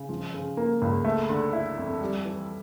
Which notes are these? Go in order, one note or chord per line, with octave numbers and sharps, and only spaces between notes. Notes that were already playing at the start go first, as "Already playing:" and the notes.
Already playing: C#3
F3
C#3
A#3
C#2
A3
D3
E4
F2
G3
E3